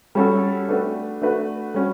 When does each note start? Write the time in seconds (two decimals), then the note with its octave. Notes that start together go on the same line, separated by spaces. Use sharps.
0.15 G3 C#4 F#4 A4
0.68 A3 D4 F#4 B4
1.21 A3 D4 F#4 B4
1.74 G3 C#4 F#4